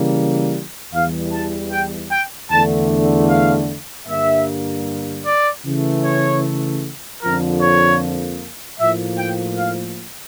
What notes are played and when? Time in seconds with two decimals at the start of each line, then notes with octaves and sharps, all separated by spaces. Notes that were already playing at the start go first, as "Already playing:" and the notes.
Already playing: C#3 E3 G3 A#3
0.93 E2 E3 G3 F5
1.33 A5
1.72 G5
2.11 G5
2.51 E2 D3 A3 A5
3.29 F5
4.07 G2 D3 G3 A#3 E5
5.26 D5
5.65 C#3 E3 A3
6.05 C#5
7.22 F2 D3 F3 A#3 A#4
7.62 C#5
8.79 A2 F3 A#3 E5
9.19 G5
9.58 F5